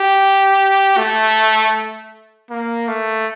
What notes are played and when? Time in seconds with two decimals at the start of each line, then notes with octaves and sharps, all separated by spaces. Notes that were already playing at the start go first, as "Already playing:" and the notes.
Already playing: G4
0.97 A3
2.50 A#3
2.88 A3